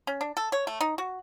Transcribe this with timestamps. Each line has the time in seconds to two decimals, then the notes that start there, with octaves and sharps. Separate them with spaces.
0.07 C#4
0.21 D4
0.37 A4
0.52 C#5
0.67 A3
0.81 D#4
0.98 F#4